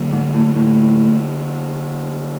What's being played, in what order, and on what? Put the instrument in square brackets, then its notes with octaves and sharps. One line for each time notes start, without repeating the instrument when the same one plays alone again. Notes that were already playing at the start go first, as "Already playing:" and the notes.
Already playing: [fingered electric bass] D3 F#3 A#3
[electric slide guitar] G#2
A2
A2